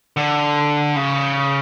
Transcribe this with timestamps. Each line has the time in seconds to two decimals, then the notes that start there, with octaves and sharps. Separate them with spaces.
0.17 D3
0.96 C#3